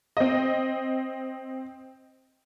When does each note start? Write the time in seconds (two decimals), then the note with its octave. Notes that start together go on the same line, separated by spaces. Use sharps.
0.17 C4 D#5